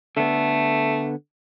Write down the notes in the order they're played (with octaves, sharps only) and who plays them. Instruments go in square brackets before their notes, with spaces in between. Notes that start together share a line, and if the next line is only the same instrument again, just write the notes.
[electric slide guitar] D3 B3 [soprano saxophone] A3